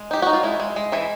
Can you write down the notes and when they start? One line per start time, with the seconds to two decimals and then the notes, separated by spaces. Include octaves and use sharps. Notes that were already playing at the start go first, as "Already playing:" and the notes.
Already playing: G#3
0.11 D#4 G4
0.22 D#4 F#4
0.33 F4
0.43 G#3 E4
0.60 G#3
0.76 G#3
0.92 E3 E4